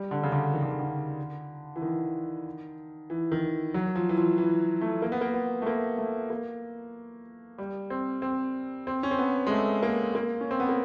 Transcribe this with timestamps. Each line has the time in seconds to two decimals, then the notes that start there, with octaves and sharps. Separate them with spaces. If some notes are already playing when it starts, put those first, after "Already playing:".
Already playing: G3
0.11 D3
0.23 C#3
0.32 D3
0.53 D#3
0.62 D3
0.71 C#3
0.79 D3
1.76 E3
1.82 D#3
3.10 E3
3.32 D#3
3.74 F#3
3.95 F3
4.09 E3
4.17 F3
4.38 E3
4.81 A3
5.02 A#3
5.12 B3
5.21 A#3
5.34 B3
5.62 A3
5.66 A#3
5.98 A3
6.30 A#3
7.58 G3
7.90 C4
8.22 C4
8.87 C4
9.03 C#4
9.11 C4
9.19 B3
9.47 G#3
9.51 A3
9.83 A#3
10.15 A#3
10.41 C#4
10.51 C4
10.60 B3
10.69 A#3